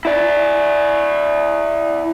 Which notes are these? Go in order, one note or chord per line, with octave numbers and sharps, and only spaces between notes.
E4 D5